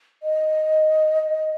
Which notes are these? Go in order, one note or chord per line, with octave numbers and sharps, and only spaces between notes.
D#5